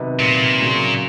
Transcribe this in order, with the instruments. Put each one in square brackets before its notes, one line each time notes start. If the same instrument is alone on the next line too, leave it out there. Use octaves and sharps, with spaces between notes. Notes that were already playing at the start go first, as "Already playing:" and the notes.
Already playing: [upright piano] C3 D#3 F#3 B3 D#4
[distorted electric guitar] A#2
[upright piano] C#3 F#3 A#3